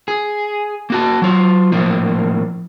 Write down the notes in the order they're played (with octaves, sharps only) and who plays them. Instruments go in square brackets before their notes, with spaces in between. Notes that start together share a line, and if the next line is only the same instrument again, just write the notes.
[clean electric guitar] G#4
A#3 F#4 A5
F#3 F4
A2 F3 A#3